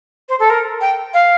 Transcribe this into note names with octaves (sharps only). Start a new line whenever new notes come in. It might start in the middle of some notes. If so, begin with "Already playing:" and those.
C5
A4
A#4
G5
F5